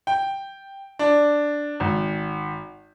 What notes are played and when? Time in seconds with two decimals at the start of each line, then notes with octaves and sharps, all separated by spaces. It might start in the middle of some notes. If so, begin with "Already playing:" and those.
0.07 G5
0.99 D4
1.80 G#1